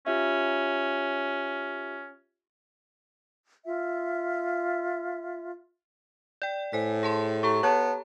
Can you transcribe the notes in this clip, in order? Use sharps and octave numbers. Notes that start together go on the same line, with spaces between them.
C#4 F4 G4 E5
F4 E5
D5 G5 G6
A2 C5 G#5 B6
G#4 A5 C6
G4 A4 A#5 C#6
B3 C#5 A5